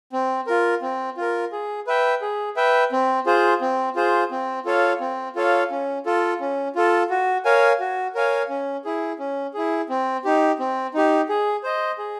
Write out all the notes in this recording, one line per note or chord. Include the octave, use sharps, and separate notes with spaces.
C4
F4 A#4
C4
F4 A#4
G#4
B4 E5 G5
G#4
B4 E5 G5
C4
F4 G#4 C5
C4
F4 G#4 C5
C4
F4 A4 C#5 F5
C4
F4 A4 C#5 F5
C#4
F4 A4
C#4
F4 A4
F#4
A#4 C#5 F5 G#5
F#4
A#4 C#5 F5 G#5
C#4
E4 G#4
C#4
E4 G#4
C4
D#4 G4
C4
D#4 G4
G#4
C5 D#5
G#4